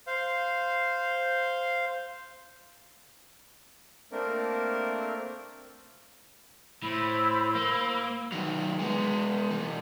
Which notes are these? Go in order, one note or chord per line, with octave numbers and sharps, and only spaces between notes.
C5 F5
A3 A#3 C4 D4 A#4
A2 C5 B5 E6
A#3
D#3 F#3
G#3 B3
B2 E3